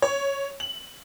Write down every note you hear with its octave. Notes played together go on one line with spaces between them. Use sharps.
C#5
F#7